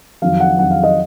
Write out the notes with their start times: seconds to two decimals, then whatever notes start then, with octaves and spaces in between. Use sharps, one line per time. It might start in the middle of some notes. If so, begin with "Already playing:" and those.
0.22 F2 D#3 F#3 F5
0.40 F#5
0.58 F2 D#3 F#3 F#5
0.71 F5
0.83 D#5